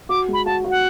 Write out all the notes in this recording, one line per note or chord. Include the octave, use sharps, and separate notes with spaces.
F#4 D6
G#3
B5
F#4 A5
F#4
F#5